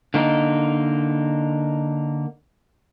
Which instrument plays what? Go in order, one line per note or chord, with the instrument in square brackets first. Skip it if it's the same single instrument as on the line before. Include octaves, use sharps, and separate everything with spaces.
[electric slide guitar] D3 A#3 D#4